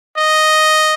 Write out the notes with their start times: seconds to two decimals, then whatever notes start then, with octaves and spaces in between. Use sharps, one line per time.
0.16 D#5